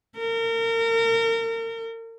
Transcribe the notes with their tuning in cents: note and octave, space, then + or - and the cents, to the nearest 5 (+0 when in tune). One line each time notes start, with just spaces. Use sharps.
A#4 -35